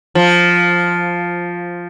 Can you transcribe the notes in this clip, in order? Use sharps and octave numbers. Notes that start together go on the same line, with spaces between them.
F3